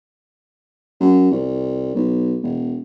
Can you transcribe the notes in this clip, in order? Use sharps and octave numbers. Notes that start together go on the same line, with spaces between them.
F#2
C2
B1
E1